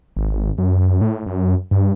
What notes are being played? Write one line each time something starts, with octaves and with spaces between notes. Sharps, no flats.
G#1
G#1
F#2
A2
F#2
G2